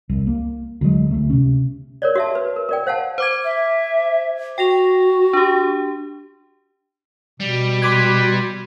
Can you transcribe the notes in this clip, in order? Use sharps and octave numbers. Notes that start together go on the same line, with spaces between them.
C2
A#3
D2 F#3 G#3
D2 A3
C3 C#4
A#4 C#5 D5
F#4 E5 A5
B4
A#4
A#4 D5 G5
C5 F5 F#5 A5
C5 D6 G#6
E5
F#4 G5 A#6 F7
D4 G4
B2 G3
B4 C6 D6 G#6